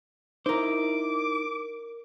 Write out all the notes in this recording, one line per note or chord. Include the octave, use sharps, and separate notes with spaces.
D#4 E4 A#4 C5 D6